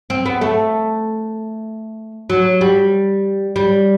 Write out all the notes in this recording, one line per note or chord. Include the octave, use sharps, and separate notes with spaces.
C4
B3
A3
F#3
G3
G3